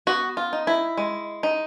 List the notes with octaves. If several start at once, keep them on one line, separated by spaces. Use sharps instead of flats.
B3 F#4
F4
D#4
E4
G#3
D#4